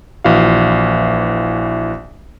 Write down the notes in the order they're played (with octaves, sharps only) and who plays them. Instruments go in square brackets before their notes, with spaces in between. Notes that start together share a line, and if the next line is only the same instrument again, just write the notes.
[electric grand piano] A#1 E3 F#4 F5